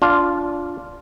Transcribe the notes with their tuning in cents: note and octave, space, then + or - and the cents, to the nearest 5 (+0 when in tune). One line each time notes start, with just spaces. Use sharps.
D4 -20 F4 +0